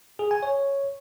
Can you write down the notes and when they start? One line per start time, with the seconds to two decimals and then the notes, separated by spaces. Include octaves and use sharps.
0.19 G#4
0.31 G#5
0.43 C#5